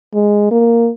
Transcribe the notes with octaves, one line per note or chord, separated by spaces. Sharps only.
G#3
A#3